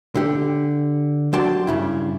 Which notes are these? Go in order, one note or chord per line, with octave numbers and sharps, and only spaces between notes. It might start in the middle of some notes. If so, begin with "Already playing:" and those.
D3 G4
F#3 D4 G4 D5 A5 C6
G2 C#3 E4